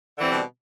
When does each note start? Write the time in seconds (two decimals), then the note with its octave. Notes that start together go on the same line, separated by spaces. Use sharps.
0.14 D3
0.18 E3
0.22 C4
0.26 G3
0.29 B2